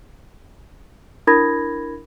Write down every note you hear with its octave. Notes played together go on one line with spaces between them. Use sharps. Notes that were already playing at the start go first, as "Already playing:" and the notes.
D4 E4 A#4 B5 G#6 A#6